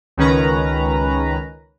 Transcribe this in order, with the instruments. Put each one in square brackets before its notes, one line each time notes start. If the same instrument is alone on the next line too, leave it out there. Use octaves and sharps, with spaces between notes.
[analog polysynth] C#2 D#3 C#4 B4 A#5